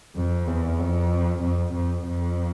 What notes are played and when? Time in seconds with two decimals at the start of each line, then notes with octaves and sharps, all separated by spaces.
0.16 F2
0.48 E2
0.79 F2
1.42 F2
1.74 F2
2.06 F2